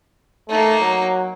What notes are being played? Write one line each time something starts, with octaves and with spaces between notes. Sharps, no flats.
A3 A#3 D#4
F#3